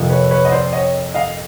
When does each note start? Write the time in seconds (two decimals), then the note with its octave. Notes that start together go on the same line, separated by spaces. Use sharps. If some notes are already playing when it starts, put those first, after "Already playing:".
Already playing: F2 C3 F3 A#3
0.10 B4 C#5
0.31 B4 C#5
0.45 D#5
0.52 C5 D5
0.73 C#5 D#5
1.15 D#5 F5